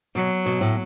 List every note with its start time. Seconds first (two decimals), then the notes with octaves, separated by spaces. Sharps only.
0.15 B2 F#3
0.46 B2
0.61 A2